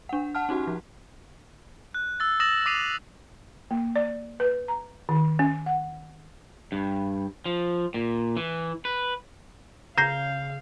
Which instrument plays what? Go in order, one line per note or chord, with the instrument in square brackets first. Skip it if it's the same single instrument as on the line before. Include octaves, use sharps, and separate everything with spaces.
[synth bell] D4 F#5
F#5 A5 F6
C#4 D#4 F#4 G4
F3
[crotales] F#6
E6 A6
D#6 E6 A6 A#6 E7 F#7
D6 D#6 B6 C7 D#7 F7
[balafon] A#3
D5
B4
A#5
D#3
C#4
F#5
[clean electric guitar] G2
F3
A#2
E3
B4
[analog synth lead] C#3 [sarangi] F5 [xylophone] A#5 A#6 C7 [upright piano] G6